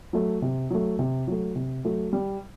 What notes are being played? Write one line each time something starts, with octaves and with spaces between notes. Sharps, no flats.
F#3 A3
C3
F#3 A3
C3
F#3 A3
C3
F#3 A3
G3